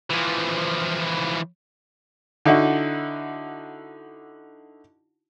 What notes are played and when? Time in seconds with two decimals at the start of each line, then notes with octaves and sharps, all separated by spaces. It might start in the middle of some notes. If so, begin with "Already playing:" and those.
0.10 E3 F3
2.45 D3 D#4 E4 F#4